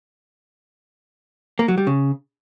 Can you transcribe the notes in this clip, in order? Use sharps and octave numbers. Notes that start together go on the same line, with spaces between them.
A#3
F#3
G3
C#3